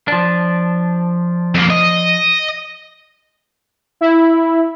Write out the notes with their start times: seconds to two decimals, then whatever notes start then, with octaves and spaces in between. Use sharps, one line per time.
0.08 F3 D4
1.55 F2 A#3
1.70 D#5
4.01 E4